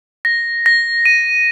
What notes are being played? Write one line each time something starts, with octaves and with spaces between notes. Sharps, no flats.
A#6
A#6
D#7